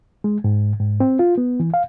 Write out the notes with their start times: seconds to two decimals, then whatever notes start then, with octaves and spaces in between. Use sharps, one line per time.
0.24 G#3
0.44 G#2
0.80 G#2
1.00 C4
1.19 F4
1.38 B3
1.60 E3
1.74 F5